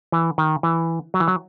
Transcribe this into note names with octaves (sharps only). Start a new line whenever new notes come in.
E3
D#3
E3
F#3
E3
F#3